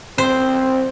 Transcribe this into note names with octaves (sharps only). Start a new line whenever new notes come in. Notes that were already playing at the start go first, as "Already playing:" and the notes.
C4 C5